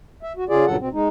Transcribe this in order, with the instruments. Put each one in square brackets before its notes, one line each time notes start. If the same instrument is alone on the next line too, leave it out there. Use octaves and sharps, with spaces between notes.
[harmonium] E5
F#4
C#3 F4 G#4 D5
G2 A#2 C#3 F#3 A4 F#5
B2 C4
G#3 D#4